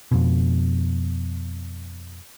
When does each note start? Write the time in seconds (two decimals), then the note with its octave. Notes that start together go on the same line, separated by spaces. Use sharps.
0.12 F2 B2